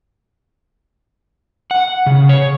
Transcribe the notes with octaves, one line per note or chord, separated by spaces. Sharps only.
F#5
C#3
C#5